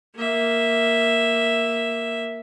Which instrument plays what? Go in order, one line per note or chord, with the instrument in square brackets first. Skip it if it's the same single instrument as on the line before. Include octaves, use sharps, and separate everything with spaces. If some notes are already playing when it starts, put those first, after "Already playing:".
[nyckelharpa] A#3 E5